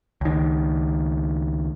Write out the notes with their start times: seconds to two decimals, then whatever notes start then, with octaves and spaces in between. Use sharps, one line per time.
0.21 C#2 D#3